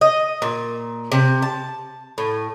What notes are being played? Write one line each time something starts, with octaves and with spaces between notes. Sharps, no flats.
D#5
A#2
C3
A5
A2